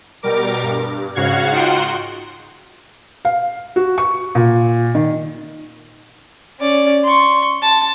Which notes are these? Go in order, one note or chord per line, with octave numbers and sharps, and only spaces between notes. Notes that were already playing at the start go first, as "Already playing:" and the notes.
B2 G3 A#4 D6
G2
G#2 C#3 F#4 F5 F#5 G#6
D#4 F4 F#4 F#5 G5 C6
F5
F#4
C#6
A#2
D#3
C#4 D5
C6 C#6
A5